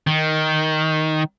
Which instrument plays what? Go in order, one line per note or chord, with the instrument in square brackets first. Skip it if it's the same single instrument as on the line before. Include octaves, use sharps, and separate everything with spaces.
[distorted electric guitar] D#3